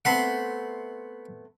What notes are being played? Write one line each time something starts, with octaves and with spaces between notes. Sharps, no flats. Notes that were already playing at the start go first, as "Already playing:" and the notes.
A3 B3 C4 F#5 B5 C6